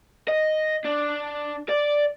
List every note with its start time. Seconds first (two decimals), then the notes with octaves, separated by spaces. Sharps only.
0.29 D#5
0.85 D4
1.69 D5